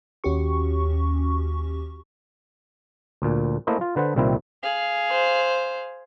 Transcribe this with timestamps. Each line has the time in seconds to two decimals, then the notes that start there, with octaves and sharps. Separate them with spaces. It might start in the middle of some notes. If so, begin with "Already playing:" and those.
0.24 D#2 C#4 F#4 G4 C#6
3.22 D2 A#2
3.67 A3 A#3 E4 C5 D#5
3.81 F4
3.96 D3 B4 C5 F#5
4.16 C2 A#2 D#3 C4 E4
4.63 G#4 F5
5.11 C5